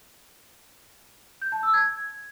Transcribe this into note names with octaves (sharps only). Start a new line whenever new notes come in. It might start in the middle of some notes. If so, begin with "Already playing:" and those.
G6
A5
E6
G#6